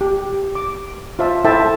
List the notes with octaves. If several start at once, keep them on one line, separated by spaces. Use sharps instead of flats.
G4
D6
F4 C5 E5 A5
E4 A4 C5 E5 G5 A5